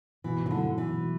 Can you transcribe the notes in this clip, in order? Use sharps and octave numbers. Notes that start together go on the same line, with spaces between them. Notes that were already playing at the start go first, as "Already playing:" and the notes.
B2 E3
E3
D3 F#3 A3 E4
B2 E3
F#3